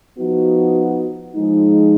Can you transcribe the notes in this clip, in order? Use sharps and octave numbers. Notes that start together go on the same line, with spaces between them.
F3 B3 D#4 F#4
F3 G#3 D#4